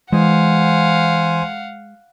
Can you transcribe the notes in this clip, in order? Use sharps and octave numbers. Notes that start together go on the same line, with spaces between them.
E3 G#3 C5 F5 F#5 G#5